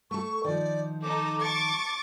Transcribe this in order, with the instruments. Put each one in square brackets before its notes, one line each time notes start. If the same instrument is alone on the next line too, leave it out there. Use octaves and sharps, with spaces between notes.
[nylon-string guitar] A3 A4 [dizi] C#6
[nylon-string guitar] D#3 F3 [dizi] D5
[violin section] D#4 A4 [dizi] D6
[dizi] A5 [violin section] C#6 D6 A6